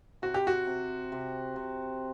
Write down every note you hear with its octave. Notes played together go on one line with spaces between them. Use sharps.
C3 F#4
G4
F#4
C3
C3
C3